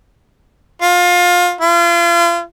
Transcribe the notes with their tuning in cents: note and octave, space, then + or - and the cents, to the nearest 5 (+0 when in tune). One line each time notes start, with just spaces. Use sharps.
F4 +25
F4 -35